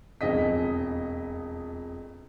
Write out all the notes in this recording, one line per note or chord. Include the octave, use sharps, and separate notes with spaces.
E1 F2 G#4 D#5 B6